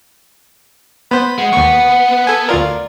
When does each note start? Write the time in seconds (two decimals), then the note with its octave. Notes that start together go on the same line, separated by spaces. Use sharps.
1.11 B3 C5 B5
1.38 G#3 F#5
1.53 D#2 B3 B4 C#6
2.27 A4 G#5
2.49 D2 F4 A#4 D5